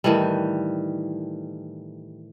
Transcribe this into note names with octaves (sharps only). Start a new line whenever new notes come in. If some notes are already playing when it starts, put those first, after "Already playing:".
A2 D#3 E3 G3